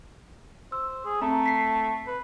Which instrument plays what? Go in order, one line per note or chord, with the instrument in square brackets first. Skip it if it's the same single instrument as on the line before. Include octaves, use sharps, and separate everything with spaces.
[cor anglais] C5 [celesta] E6
[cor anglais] G#4
[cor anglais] A3 [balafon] C4 [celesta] A#5
[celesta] B6 C7
[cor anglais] B4